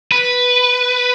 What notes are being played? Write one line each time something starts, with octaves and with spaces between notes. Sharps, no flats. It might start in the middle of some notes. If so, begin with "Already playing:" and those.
B4